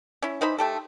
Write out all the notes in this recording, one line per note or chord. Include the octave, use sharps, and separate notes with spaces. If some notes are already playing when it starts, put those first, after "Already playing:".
C#4 E4
E3 D#4 C5 B5
A3 G4 A4